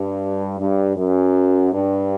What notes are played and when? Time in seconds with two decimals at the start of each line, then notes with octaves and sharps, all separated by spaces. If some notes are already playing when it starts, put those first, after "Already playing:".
Already playing: G2
0.59 G2
0.97 F#2
1.73 G2